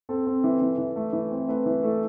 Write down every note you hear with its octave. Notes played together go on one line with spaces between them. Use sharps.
C4 A4
C4
E3
E3
E3
A3
E3
C4
A3 B4
E3
A3 A4